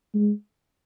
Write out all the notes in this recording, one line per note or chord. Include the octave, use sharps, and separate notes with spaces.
G#3